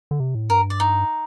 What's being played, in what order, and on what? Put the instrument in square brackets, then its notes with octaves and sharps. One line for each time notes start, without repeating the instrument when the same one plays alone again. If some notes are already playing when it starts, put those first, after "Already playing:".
[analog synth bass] D3
C3
A2
[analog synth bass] G2 [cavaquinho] A#4
[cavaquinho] D5
D#4